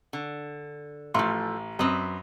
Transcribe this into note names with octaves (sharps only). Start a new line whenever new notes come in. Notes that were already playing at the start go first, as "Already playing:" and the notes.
D3
A1 F3 A3 C6
F#2 C4 B4 D#5